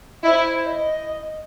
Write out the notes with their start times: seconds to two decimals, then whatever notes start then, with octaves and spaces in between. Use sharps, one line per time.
0.23 E4 C5 D#5
0.66 D#5